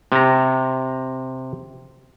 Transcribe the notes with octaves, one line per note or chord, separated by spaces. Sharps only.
C3 A#5